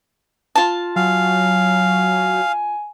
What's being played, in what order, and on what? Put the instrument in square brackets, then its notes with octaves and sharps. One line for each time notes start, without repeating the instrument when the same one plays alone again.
[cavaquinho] F4 A5
[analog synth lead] F#3 [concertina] F5 [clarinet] G#5